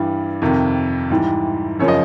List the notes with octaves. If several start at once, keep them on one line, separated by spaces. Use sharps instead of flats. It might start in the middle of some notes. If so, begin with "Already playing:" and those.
Already playing: G2 E3 G3
F2 C3 D#3
G#2 E3 G3
F#2 C#3 F3 C#5
D#5